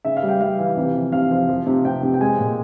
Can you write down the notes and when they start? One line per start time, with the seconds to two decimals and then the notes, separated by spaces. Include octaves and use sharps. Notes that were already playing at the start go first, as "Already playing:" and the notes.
0.05 C#3 E5
0.17 F5
0.23 G3
0.28 G5
0.41 G3 F5
0.59 E3
0.77 C3
0.94 F3
1.12 C3 F5
1.31 F3
1.49 F3
1.67 C3
1.85 C3 G5
2.03 C3
2.14 G5
2.20 G#3 G#5
2.39 A#2